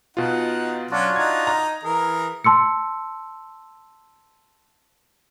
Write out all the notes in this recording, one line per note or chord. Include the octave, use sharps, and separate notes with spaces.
B2 D#4 F4 F#5
F#3 C#4 D4 F4 F#4
D#4 G#6
A#5
E3 G#4 A#4
A5 C6 E6 C#7